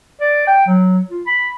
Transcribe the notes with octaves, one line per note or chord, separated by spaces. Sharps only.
D5
G5
F#3
F4
B5